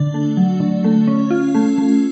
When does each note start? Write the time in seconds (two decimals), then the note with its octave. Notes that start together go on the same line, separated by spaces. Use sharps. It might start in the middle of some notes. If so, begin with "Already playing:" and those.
Already playing: D3 D4
0.14 A3
0.37 F#3
0.60 D3
0.84 A3
1.07 C#4
1.30 F4
1.55 A3
1.78 A3